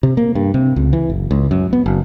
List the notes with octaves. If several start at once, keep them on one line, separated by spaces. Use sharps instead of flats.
C3
A#3
G2
C3
C#2
E3
F#1
C#2
F#2
B3
F#1